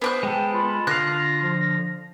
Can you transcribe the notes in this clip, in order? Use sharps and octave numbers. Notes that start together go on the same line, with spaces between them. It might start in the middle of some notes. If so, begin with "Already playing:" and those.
B3 C5 D6 F#6
G#3 A4 G5
F4 B5
D3 F5 F#6 A#6
F3